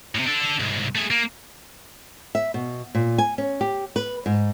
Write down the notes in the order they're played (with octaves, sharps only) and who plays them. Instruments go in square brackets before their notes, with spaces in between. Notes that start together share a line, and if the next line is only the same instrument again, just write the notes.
[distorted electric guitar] A2 C3
D4 A4
C2 G#2
A3 G#4
A#3
[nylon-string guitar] E5
B2
A#2
G#5
C#4
G4
B4
G#2